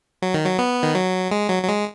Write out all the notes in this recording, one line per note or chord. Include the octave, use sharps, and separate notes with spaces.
F#3
D#3
F#3
B3
D#3
F#3
G#3
F#3
F#3
G#3